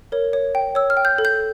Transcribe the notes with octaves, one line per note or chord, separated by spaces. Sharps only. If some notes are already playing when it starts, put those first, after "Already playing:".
A#4 C#5
C#5
G5
C#5 E6
F6
G5
G6
A4
G6